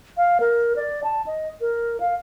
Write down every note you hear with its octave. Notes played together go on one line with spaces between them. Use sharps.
F5
A#4
D5
A5
D#5
A#4
F5